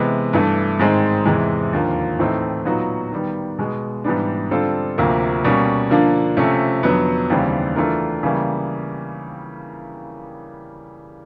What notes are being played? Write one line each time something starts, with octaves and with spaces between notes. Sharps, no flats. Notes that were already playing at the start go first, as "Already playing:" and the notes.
Already playing: C3 E3 G#3 B3
G2 E3 A3
G#2 D#3 G#3 C4
E2 C3 E3 G#3
D#2 D3 F3 A#3
A2 E3 A3 C4 D#4
A#2 F#3 B3 D#4 F#4
D#3 G3 B3
B2 G#3 B3
G#2 E3 G3 B3 D4
D3 G3 C4 F4 A4
D2 C3 F3 A#3
B2 G3 A#3 C#4
D3 F3 A#3 D4
C3 F3 A3 C#4
F2 D3 F#3 B3
D#2 C#3 E3 G3 C4
E3 A3 D4 F4 A#4
C#3 E3 G3 A#3